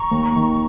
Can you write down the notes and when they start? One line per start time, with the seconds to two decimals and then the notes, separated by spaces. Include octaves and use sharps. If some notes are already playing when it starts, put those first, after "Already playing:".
Already playing: A#5 C#6
0.11 D#2
0.36 D#3